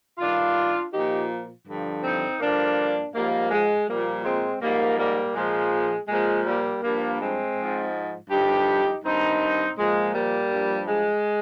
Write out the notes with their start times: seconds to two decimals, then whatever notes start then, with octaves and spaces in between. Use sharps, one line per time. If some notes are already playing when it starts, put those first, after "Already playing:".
0.18 G2 D#3 D4 F4
0.92 A#2 F3 D#4 G4
1.66 G2 D3 F3
2.04 C4 D#4
2.40 G2 D3 F3 A#3 D4
3.14 G#2 F3 G3 A#3
3.51 G#3
3.87 A#2 F3 G3 A#3
4.24 G#3 C4
4.61 G#2 F3 G3 A#3
4.99 G3 A#3
5.35 A#2 F3 G#3
6.08 A#2 F3 G#3
6.46 G3 A#3
6.82 G2 F3 G3 A#3
7.20 G#3 C4
7.57 G#2 F3
8.30 G2 D3 F3 D#4 G4
9.04 G2 D#3 C4 D#4
9.77 A#2 F3 G#3
10.14 G3 A#3
10.51 G2 F3
10.88 G#3